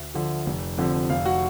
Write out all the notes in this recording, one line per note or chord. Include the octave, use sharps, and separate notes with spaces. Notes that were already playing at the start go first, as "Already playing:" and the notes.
Already playing: D2
D3 F3
F1
F2 D3 F3
F1 F5
F#4